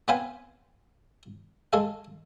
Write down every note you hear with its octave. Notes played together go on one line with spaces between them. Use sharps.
B3 C4 B4 C5 F5 G#5
G#3 A4 F5